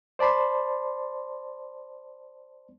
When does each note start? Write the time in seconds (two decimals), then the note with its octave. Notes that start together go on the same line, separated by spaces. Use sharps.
0.19 C5 D5 A5 B5 C6